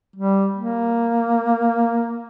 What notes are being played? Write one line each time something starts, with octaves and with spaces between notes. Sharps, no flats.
G3
A#3